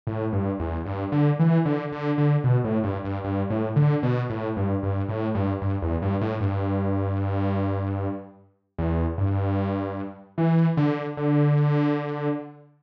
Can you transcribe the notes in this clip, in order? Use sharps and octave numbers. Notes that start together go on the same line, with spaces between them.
A2
G2
E2
G2
D3
E3
D3
D3
D3
B2
A2
G2
G2
G2
A2
D3
B2
A2
G2
G2
A2
G2
G2
E2
G2
A2
G2
E2
G2
E3
D3
D3